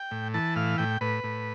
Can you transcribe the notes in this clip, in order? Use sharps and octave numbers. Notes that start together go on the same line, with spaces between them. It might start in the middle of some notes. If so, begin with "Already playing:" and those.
Already playing: G5
A2
E3 A5
A2 F5
A2 G5
A2 B4
A2